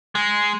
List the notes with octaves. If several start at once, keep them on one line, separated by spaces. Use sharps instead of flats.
G#3